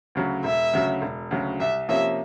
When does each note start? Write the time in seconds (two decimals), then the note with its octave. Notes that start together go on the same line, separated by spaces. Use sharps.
0.15 D2 C#3 F#3
0.44 E1 E5
0.73 D2 C#3 F#3
1.02 E1
1.31 D2 C#3 F#3
1.59 C2 E5
1.89 C3 F3 A#3 C#4 E5